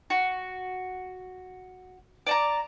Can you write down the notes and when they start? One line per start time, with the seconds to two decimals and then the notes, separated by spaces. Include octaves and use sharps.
0.10 F#4
2.27 D5 A5 A#5